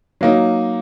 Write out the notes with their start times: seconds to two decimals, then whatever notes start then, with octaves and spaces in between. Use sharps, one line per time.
0.21 F#3 A#3 D#4